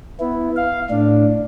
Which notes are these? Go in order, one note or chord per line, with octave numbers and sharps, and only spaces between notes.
B3 E4
F5
A2 D4